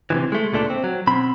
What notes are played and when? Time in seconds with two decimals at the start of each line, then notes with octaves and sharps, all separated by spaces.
0.10 C3 D#3 E3
0.32 G#3 A3
0.53 C#2 A#2 A3 D4
0.70 C4
0.84 F#3
1.07 B2 C4 B5